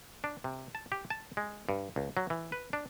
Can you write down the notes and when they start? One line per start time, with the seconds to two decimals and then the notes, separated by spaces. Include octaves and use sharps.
0.24 D4
0.44 C3
0.75 A5
0.92 G4
1.10 A5
1.37 G#3
1.69 G2
1.96 C#2
2.17 F#3
2.30 E3
2.52 B4
2.73 D4